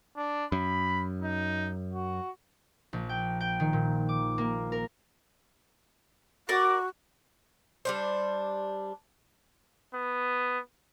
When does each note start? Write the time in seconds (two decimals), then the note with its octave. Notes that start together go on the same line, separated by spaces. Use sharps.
0.17 D4
0.52 F#2 B5
1.22 D#4
1.93 F#4
2.93 A#1
3.09 G5
3.40 G5
3.60 D#3
3.73 A#2
4.09 D6
4.38 A#3
4.72 A#4
6.49 F#4 A#4 D5
7.85 G3 D4 C5
9.94 B3